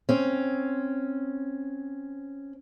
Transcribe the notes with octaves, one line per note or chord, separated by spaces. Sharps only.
C4 C#4